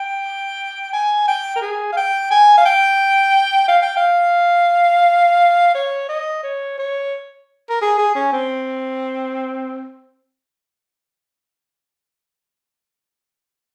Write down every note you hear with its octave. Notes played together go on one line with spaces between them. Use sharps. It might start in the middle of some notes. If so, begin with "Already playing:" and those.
Already playing: G5
G#5
G5
A#4
G#4
F5
G5
G#5
F5
G5
F5
G5
F5
C#5
D#5
C#5
C#5
A#4
G#4
G#4
C#4
C4